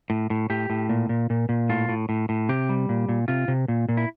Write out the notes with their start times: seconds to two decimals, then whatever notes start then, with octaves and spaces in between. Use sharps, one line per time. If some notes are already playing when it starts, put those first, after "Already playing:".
0.10 A2
0.30 A2
0.50 A2 G4
0.70 A2
0.89 A#2
1.09 A#2
1.30 A#2
1.49 A#2
1.69 A2 F4
1.89 A2
2.09 A2
2.29 A2
2.49 C3 G4
2.69 G3
2.89 A#2
3.09 A#2
3.28 C3 F4
3.48 C3
3.68 A#2
3.89 A#2
3.97 E4